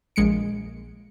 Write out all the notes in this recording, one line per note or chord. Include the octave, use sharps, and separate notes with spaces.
A#1 G#3 C#7 D7